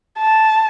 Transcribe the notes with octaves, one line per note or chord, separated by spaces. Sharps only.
A5